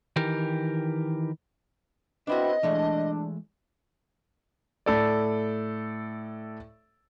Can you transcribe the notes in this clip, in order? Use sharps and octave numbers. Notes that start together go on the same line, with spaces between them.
D#3 E3 G4 A#4
B3 C4 D4 E4 F#4 D#5
E3 G#3 A3 D4
A2 A4 D5